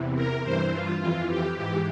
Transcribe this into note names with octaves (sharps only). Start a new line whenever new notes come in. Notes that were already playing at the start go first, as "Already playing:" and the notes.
Already playing: E2 C3 E3
A#4
G2 E3 C5
F4
F2 E3 F4
G4
G#2 E3 G4